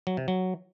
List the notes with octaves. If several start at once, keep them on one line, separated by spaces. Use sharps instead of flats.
F#3
C3
F#3